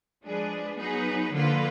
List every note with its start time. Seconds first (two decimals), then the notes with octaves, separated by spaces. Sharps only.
0.25 F3 G#3 D4 G#4 B4
0.78 F#3 B3 D#4 G#4 B4
1.32 D3 F3 A#3 F4 B4